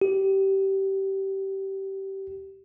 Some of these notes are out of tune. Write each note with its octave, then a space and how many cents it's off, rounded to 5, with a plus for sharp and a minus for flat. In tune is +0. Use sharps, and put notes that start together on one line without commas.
G4 -20